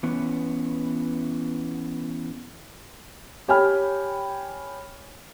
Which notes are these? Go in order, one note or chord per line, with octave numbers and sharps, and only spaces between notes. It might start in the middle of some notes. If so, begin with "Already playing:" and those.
E3 B3 C#4
G4 C#5 G5 G#5 B5 F6